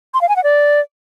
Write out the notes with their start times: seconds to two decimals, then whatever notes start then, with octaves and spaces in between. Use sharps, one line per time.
0.14 C6
0.21 F5
0.29 G#5
0.36 F#5
0.44 D5